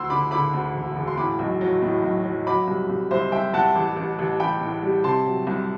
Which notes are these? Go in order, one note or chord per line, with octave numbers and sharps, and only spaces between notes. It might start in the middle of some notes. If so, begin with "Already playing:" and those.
Already playing: D2 C6 E6
D3 B5 D6
D3 B5 D6
D2
E1
E1
C6
A2 B5 D6
B1
F#3
A2
B1
F#3
F#3 B5 D6
C2
C2
C2 C5 E5
C2 E5 G5
C2 F#5 A5
A1
A1
A1
A1 G5 B5
A2
G3
C3 A5 C6
F#3
C2